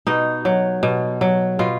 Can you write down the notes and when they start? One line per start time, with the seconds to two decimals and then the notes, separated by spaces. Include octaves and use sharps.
0.07 B2 D#4
0.45 F#3
0.83 B2
1.21 F#3
1.59 B2 F4